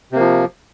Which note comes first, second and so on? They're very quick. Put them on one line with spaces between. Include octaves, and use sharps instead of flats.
C3 A#3 F3